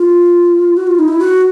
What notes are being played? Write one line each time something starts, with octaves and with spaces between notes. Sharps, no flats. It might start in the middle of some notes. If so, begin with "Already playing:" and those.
Already playing: F4
F#4
F4
D#4
E4
F#4